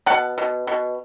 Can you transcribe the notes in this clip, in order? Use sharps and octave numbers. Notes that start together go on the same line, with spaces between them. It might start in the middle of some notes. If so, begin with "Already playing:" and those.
B2 F#5 A5
B2
B2